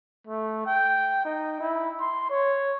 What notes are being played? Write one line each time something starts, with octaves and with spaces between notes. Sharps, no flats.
A3
G5
D#4
E4
C6
C#5